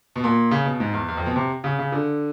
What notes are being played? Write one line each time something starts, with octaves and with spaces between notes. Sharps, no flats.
B2
A#2
C#3
B2
G#2
E2
E2
F2
B2
C3
C#3
C#3
D3